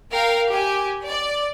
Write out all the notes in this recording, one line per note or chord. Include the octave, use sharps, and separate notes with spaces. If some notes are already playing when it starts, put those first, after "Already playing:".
A#4 F5 G5
G4 G#5
D5